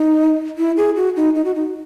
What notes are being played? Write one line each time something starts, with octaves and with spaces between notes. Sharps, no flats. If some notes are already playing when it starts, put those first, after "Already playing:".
Already playing: D#4
E4
G#4
F#4
D#4
D#4
F#4
D#4